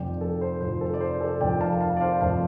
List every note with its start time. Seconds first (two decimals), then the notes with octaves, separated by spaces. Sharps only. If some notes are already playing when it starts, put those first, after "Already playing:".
Already playing: F1 F2 F3 D5 G5
0.21 A4
0.41 C5
0.61 F1 F2 F3 C5
0.81 A4
0.94 D5
1.01 C5
1.20 A4 D5
1.40 F1 F2 F3 D5 G5
1.61 F5 A5
1.81 F5 A5
1.97 D5
2.01 C5 F5
2.21 F1 F2 F3 F5 A5